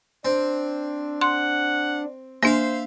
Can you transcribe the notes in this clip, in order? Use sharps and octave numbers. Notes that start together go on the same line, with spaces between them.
C4 D4
F#5 C6
A#3 D4 C5 E5 F5